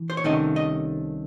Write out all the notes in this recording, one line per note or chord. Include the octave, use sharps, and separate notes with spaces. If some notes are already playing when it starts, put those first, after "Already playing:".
Already playing: E3
C5
C#5
C2 C3 D#3 A3 C#4 D#5
D#5